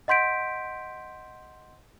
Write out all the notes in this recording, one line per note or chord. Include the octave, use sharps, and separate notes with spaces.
D#5 F#5 C6 G6 B6 D7